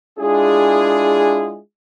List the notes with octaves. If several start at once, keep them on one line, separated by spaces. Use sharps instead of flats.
G#3 D4 E4 F4 G#4